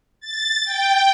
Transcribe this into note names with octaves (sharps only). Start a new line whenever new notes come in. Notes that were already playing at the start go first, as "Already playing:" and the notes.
A6
G5